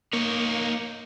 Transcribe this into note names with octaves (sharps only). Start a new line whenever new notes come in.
A#3 D#4 C#5